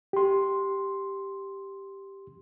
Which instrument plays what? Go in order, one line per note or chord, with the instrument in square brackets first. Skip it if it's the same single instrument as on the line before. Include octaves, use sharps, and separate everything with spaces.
[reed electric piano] G4 C6